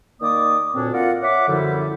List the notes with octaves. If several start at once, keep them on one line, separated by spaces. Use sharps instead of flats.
D#3 A#3 D5 D6 D#6
D2 A#2 C4 D4 C#5
F4 A#4 D5 F5 F#5
C#5 E5 F#5 D6
F#2 D3 F3 G3 E4